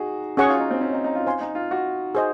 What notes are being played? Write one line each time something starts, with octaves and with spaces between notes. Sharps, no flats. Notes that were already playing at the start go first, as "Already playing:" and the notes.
Already playing: D#4 F#4 G#4
C#4 F#4 G#4 C#5 F#5 C#6
F4
D#4
C4
C#4
D#4
D#4
F4
C5 F5 G#5 C6
D#4
F4
F#4
G#4 C5 D#5